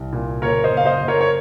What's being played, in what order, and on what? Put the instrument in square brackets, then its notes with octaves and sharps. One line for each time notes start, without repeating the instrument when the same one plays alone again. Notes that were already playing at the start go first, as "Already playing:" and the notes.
Already playing: [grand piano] C2
A#2
F#1 A#4 C#5
C5 D#5
F#1
F5
C5 D#5
F#1
A#4 C#5
C#5